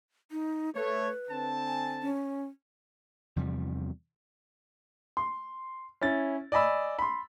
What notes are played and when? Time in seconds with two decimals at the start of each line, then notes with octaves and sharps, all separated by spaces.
0.31 D#4
0.75 A3 B4 C#5
1.31 D3 C4 A5
1.67 G#5
2.02 C#4
3.36 E2 C3 F3 G3
5.17 C6
6.01 C#4 E4 A6
6.52 D5 D#5 G#5 B5 E6
6.99 B5 C6